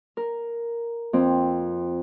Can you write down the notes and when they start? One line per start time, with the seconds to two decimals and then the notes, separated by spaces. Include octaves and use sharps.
0.17 A#4
1.13 F2 C4